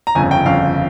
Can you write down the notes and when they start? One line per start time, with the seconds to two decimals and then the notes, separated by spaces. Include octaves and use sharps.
0.07 A#5
0.15 G1 F2 C#3 G#5
0.31 G5
0.45 G1 F2 C#3 F5